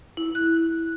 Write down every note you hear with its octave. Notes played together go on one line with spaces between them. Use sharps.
E4
F#6